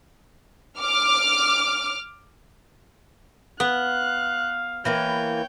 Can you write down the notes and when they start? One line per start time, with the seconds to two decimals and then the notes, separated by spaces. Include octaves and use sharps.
0.80 D6 F6
3.60 B3 F5 F#6
4.85 E3 A#3 B4 C#5 G5